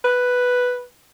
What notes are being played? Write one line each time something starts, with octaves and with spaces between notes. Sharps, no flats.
B4